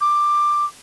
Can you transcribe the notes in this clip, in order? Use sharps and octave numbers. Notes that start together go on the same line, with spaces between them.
D6